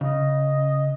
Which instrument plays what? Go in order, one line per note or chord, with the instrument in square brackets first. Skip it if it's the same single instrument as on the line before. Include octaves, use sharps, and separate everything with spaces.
[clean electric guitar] C#3 [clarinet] D#5